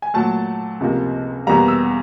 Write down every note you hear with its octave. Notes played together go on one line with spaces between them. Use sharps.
G#5
A#2 F#3 A3 A5
C#2 C3 F3 A#3
E2 B2 G3 A#3 A#5
E6